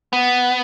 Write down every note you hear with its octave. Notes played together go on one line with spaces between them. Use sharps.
B3